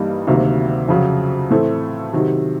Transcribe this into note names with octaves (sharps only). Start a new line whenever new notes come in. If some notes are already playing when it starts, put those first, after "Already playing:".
Already playing: G2 E3 G3 A#3 D#4
D2 C3 D#3 F#3 A#3
F2 C#3 F#3
A2 E3 A3 C4
C3 D#3 F#3